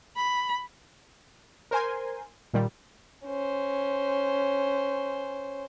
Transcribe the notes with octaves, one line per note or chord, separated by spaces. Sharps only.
B5
A#4 C5 G#5 C6
A#2 D#3 G3
C#4 C5